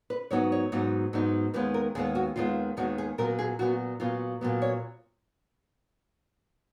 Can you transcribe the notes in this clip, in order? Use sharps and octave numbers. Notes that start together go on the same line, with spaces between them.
B4
G#2 F#3 B3 D#4 C#5
C#5
G#2 F#3 B3 D#4
G#2 F#3 B3 D#4
D#2 D#3 G#3 B3 B4
A#4
D#2 D#3 G#3 B3 G#4
F#4
D#2 D#3 G#3 B3 F4
D#2 D#3 G#3 B3 F#4
G#4
A#2 F#3 B3 A#4
G#4
A#2 F#3 B3 F#4
A#2 F#3 B3 F4
A#2 F#3 B3
C#5